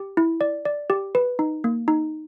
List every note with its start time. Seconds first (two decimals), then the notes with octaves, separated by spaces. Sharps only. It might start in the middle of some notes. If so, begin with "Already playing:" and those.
Already playing: G4
0.17 E4
0.41 D5
0.65 D5
0.90 G4
1.15 B4
1.39 D#4
1.64 A#3
1.88 D#4